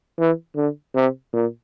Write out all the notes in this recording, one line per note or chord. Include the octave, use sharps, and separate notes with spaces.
E3
D3
C3
A#2